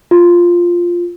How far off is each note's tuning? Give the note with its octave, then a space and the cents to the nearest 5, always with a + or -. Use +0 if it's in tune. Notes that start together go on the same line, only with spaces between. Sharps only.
F4 +0